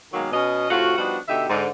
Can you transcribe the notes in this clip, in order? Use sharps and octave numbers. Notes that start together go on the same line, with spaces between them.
B2 D#3 F#3 G#3 A#3
B2 C#4 D#5
F2 A2 C3 F4 F#4
F3 G3 B3 D4 D#4 F#4
B2 D3 D#4 G4 E5
G#2 D3